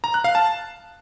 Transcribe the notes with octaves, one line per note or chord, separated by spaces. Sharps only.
A#5
F#6
F5
A5